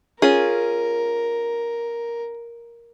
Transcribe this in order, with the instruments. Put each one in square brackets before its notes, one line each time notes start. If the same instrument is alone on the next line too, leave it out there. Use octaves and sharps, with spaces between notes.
[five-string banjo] C#4 F4 G#4 [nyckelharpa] A#4